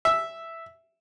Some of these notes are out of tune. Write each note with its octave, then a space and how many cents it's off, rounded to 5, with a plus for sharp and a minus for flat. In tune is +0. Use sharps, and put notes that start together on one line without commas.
E5 +0